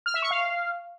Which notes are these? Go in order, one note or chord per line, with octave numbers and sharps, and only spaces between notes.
F6
E5
C#6
F5